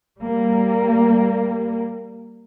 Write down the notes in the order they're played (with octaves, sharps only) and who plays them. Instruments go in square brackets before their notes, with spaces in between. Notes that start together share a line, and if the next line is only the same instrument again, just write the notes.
[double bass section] G3 A#3